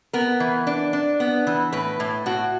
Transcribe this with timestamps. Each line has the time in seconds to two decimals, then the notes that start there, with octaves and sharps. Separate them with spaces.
0.13 B3 A#4
0.40 E3
0.67 D4
0.93 D4
1.20 B3
1.47 E3
1.72 A2 B4
2.00 A2
2.26 A2 F#4